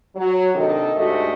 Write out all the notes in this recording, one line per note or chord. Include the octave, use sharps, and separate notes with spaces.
F#3
C3 D#3 A#3 D4 A4 D#5
D2 G#2 A3 F#4 G4 D#5